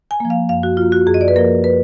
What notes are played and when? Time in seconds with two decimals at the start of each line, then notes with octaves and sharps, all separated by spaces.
0.11 G#5
0.20 F3 A#3
0.30 F5
0.49 F#2 F5
0.63 F#4
0.77 F3 A#3 F4
0.92 F#4
1.07 F#2 G#4
1.14 D#5
1.21 D5
1.28 B4
1.36 F3 A#3 A#4
1.64 B4